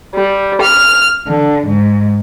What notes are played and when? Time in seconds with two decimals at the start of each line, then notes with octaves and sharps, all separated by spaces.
0.15 G3
0.62 F6
1.27 D3
1.67 G#2